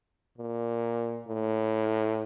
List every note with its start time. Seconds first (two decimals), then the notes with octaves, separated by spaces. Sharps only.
0.38 A#2
1.28 A2